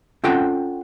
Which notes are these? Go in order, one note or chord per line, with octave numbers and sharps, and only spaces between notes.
C4 C#4 F4 A4 F#5 G5